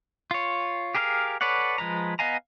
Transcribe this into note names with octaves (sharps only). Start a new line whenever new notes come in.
F4 C#5
G4 G#4 A#4 C5 F5
A4 B4 C#5 D5 F#5
F3 G#3 B4 A#5
B3 D#5 F5 G#5 A#5